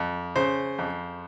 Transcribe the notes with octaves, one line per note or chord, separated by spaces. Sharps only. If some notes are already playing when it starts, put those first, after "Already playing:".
Already playing: F2
C#3 C5
F2